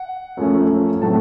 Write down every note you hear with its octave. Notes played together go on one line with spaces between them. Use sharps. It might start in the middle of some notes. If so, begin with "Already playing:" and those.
Already playing: F#5
F#2 F3 A3 C#4
A2 F#3 A3 C4 A5